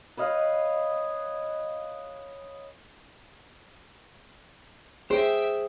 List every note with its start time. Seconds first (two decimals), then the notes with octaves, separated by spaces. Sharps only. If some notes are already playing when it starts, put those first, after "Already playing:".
0.17 B4 C#5 D#5 F5
5.11 G#4 C5 E5 G5